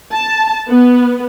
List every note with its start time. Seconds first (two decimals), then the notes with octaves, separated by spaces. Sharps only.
0.13 A5
0.69 B3